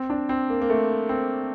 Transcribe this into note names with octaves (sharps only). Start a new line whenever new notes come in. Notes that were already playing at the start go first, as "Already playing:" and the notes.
Already playing: C4
D4
C4
A#3
A#3
A3
C4